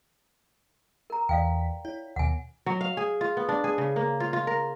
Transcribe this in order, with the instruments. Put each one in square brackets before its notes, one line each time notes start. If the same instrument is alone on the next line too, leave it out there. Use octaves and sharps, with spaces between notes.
[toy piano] A#4 A#5
[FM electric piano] E2 B6 [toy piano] D5 F5 G5
[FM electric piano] E4 [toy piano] C#5
[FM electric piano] D#2 B2 [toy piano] F#5 G#5
[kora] F#3
F5
G#4
F4
B3
D4
G#4
C#3
A#3
F4
F4
A#4